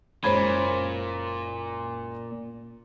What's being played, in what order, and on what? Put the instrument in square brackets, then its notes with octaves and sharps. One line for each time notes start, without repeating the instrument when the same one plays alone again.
[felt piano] F#1 G#3 G#6 [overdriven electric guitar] A#2 [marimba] C5 C#5 B5